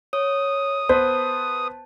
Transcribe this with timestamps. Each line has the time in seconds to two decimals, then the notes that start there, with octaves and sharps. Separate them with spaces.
0.13 C#5 D#6
0.89 B3 B4 C5 A5